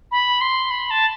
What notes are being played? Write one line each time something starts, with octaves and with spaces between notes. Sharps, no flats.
B5
C6
B5
A5